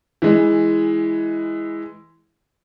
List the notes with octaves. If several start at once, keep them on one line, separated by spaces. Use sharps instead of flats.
E3 G#3